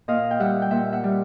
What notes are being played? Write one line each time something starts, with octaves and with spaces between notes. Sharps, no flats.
A#2 D#5 F5
G5
G3 E5 F#5
G5
A#2 E5 F#5
E5 F#5
G3